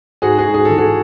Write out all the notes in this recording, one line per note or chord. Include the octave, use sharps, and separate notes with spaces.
G#2 F#4 G#4
F#4 G#4
G#2
G#4
E3 A4
F#4 G#4